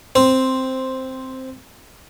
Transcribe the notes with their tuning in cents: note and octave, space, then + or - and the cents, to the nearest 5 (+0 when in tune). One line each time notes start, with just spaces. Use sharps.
C4 +0